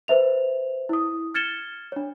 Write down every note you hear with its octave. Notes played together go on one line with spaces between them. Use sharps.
B4 C5 E5 F7
E4 D#6
F6 G#6 A6 C#7 E7 G7
D4 C#5